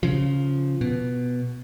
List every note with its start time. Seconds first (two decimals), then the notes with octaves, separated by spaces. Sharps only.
0.03 C#3 F3
0.81 B2